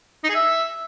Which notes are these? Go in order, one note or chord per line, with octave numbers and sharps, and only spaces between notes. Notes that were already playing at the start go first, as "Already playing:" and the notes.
D#4
G#4
E5